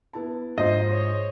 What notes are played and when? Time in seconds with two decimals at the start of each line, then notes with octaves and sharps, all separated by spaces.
0.13 B3 E4 A5
0.58 G#2 F3 C5 D#5
0.92 C#5